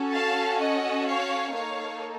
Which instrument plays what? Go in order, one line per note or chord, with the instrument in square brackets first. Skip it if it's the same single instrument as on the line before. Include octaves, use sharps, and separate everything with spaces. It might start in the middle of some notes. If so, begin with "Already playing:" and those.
Already playing: [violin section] C#4 F#4 A4
F5 A5
D#5 F#5
C#5 F5
A#3 D#4 A4 C#5 F5